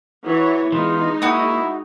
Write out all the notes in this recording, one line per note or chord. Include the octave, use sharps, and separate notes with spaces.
E3 F#3 C#5
E3 G#3 B3 D#4 F4
A#3 E4 F#4 D#6